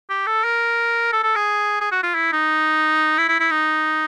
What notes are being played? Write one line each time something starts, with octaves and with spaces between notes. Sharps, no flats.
G4
A4
A#4
A4
A4
G#4
G#4
F#4
F4
E4
D#4
E4
E4
E4
D#4